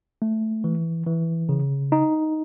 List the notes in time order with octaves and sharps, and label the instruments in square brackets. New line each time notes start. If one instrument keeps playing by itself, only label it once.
[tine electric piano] A3
E3
E3
C#3
D#4